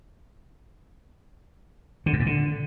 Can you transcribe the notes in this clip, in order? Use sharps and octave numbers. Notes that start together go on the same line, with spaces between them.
D3
F#2
A#2
D3